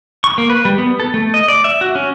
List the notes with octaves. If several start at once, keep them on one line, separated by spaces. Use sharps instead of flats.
C#6
A#3
B4
G3
B3
A4
A3
D#5
D5
E5
F#4
C#4